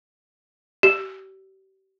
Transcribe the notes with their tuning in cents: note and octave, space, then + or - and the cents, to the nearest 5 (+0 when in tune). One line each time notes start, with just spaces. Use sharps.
G4 -35